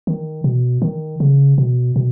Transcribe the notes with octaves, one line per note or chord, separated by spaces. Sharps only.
D#3
B2
D#3
C#3
B2
B2